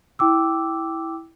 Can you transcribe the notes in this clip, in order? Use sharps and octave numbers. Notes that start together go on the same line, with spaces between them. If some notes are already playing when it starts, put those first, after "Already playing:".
E4 G5 D6 E6